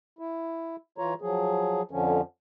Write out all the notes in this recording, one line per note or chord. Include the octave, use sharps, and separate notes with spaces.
E4
E3 F4 C#5 A#5
F3 F#3 G#4
F2 D3 F3 C#4